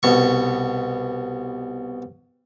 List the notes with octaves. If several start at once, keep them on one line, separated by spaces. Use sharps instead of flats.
C2 B2 C#6